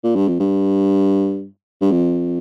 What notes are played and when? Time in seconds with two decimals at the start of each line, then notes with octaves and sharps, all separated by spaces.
0.04 A#2
0.16 G2
0.28 F2
0.40 G2
1.81 G2
1.92 F2